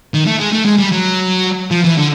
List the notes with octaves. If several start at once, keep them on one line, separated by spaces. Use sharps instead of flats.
D#3
A3
G#3
A3
G#3
G3
F#3
F3
E3
D3